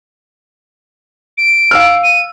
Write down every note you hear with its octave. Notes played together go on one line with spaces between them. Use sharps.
D7
F5 E6 F6
D#7